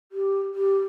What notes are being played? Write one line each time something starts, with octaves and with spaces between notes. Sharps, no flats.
G4
G4